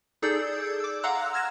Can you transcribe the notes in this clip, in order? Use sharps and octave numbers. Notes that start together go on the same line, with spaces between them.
D#4 G#4 A4 D5 E6 G6
D6 E6
F5 F#5 A#5 C6 E6 F#6
E6 F6 G#6 A#6 E7